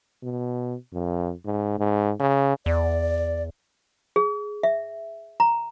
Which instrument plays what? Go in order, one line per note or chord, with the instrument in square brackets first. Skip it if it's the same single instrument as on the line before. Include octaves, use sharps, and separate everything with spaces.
[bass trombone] B2
F2
G#2
G#2
C#3
[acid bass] E2 [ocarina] D5
[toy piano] G#4
E5
A#5